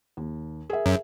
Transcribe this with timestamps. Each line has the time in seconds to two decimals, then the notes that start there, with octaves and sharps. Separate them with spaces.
0.17 D#2
0.70 G#4 A#4 E5
0.86 F#2